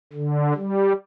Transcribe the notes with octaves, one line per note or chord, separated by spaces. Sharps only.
D3
G3